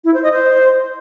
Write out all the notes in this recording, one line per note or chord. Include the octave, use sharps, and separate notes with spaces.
E4
C5
D#5
C5